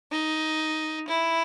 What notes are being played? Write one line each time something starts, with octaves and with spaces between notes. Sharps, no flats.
D#4
E4